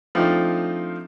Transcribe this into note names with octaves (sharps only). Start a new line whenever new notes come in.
F3 A3 C4 D4 D#4 F4